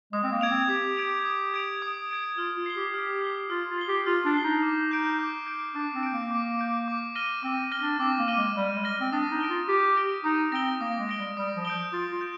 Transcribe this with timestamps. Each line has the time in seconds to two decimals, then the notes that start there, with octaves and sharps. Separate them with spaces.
0.13 G#3 D#6
0.23 C4
0.32 A#3
0.41 G#6 D7 F7
0.50 C4
0.69 G4 D#6
0.97 G#6 D7 F7
1.25 D#6
1.54 G#6 D7 F7
1.82 D#6
2.09 G#6 D7 F7
2.37 F4 F6
2.57 F4
2.66 C7 G7
2.76 G4
2.94 G4 F6
3.22 C7 G7
3.50 F4 F6
3.69 F4
3.78 C7 G7
3.88 G4
4.06 F4 F6
4.25 D4
4.34 C7 G7
4.44 D#4
4.63 D6
4.91 G6 D7
5.19 D6
5.47 G6 D7
5.75 D4 D6
5.94 C4
6.03 G6 D7
6.12 A#3
6.31 D6
6.59 G6 D7
6.88 D6
7.15 F6 A#6 D#7 G7
7.43 C4 D6
7.72 F6 A#6 D#7 G7
7.82 D4
7.99 C4 D6
8.19 A#3
8.28 F6 A#6 D#7 G7
8.37 G#3
8.56 G3 D6
8.75 G#3
8.84 F6 A#6 D#7 G7
9.01 C4
9.12 D4 D#6
9.31 D#4
9.40 A#6 D7 G7
9.50 F4
9.68 G4 D#6
9.96 A#6 D7 G7
10.24 D#4 D#6
10.52 C4 A#6 D7 G7
10.81 A#3 D#6
10.99 G#3
11.09 A#6 D7 G7
11.18 G3
11.37 G3 D#6
11.56 F3
11.65 G6 D7 G7
11.93 F4 D#6
12.12 F4
12.21 G6 D7